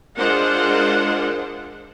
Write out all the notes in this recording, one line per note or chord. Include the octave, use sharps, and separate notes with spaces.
G#3 D4 F4 A#4 C5 F#5